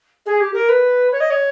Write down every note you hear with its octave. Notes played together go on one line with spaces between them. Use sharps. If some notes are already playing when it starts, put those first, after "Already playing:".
G#4
G4
A#4
B4
C#5
D#5
C#5